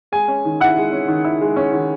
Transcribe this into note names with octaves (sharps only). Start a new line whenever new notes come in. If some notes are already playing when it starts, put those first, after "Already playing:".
G#3 G#5
C#4
D#3
E4 F#5
G#3
C#4
D#3
E4
G#3
C#4
D#3